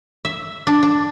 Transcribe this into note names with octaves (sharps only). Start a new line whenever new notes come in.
E5
D4
D4